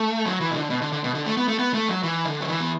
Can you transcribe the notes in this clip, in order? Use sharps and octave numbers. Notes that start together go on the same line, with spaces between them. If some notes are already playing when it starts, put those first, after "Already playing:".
Already playing: A3
F#3
E3
B2
D3
B2
D3
D3
B2
D3
A3
B3
A3
B3
A3
F#3
E3
D3
F#3
E3
B3